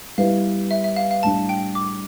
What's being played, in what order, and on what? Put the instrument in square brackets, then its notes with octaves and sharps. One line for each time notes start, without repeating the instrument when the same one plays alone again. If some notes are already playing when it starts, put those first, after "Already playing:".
[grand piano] G3 B3 E4 B4 [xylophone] F5
[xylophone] E5
E5
F5
F5
[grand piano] A2 G3 D4 [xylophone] A5
[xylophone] G5
D6